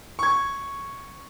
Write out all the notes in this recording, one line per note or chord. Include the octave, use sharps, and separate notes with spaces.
C#6 G#6